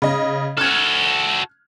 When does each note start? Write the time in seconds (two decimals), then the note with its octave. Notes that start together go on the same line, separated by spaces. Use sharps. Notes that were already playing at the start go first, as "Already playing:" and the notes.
0.02 C#3 D#5
0.57 F#4 A4 F6 F#6 G#6